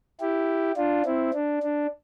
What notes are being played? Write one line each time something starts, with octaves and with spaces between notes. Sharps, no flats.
E4 G4
D4 F4
C4 E4
D4
D4